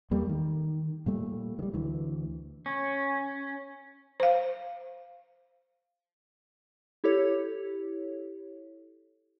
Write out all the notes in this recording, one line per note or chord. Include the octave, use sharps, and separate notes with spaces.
E2 G3 A3 A#3
D#3
A#2 G3 A3
D#3 G3
D2 E3
C#4
C5 F5
E4 G4 A4 C#5